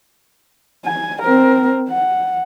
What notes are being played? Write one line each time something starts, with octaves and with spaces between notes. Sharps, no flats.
G#5
C4 A#4
F#5